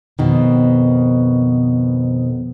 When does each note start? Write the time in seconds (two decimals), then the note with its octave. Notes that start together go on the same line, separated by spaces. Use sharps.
0.19 F2 B2 D#3